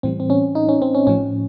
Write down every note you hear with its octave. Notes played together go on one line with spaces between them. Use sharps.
A2 E3 G3 C4
C4
C#4
D#4
C#4
C4
C#4
A2 F3 C#4